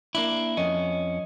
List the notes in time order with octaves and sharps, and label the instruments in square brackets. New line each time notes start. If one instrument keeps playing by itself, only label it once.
[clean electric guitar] A#3 D4 E4
[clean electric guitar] F2 C#4 [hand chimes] D#5